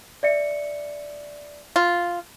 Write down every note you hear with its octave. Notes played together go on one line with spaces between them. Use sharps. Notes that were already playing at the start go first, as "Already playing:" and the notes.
D5 E5 C#7
F4